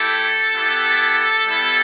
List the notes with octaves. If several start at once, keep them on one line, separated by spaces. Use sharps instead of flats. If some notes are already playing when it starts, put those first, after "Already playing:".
Already playing: A3 E4 G4 A4
B3 E4 G4
G3 B3 E4 G4